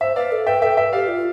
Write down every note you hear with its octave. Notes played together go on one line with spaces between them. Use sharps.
C5 E5
B4 D5 F5
A4
B4 E5 G5
A4 E5 G5
B4 E5
G4 D5 F5
F4